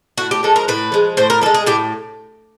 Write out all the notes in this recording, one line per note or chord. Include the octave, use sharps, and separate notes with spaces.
A2 F#4
G4
F3 G#3 A4
A#4
A2 B4
F3 G#3
A2 C5
A#4
F3 G#3 A4
G#4
A2 G4